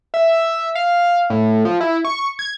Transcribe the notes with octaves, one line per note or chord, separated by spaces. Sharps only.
E5
F5
A2
F3
E4
C#6
G#6